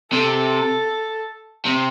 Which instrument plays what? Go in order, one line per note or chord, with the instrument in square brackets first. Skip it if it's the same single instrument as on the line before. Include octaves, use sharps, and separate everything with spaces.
[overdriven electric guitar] C3 [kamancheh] A4
[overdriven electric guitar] C3